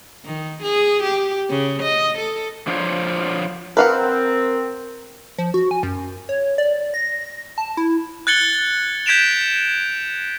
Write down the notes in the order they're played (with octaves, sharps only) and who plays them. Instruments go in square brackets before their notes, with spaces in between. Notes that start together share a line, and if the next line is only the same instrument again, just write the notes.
[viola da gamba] D#3
G#4
G4
C#3
D#5
A4
[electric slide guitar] F3 D4 F4 G#4 C5 C#5
[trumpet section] C4 [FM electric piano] A#4 [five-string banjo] B4 F5 F#5
[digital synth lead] F3
F#4
G#5
F#2
C#5
D5
A#6
A5
E4
[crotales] F#6 G#6 A6 C#7 F#7 G7
G6 G#6 B6 D7 E7 F7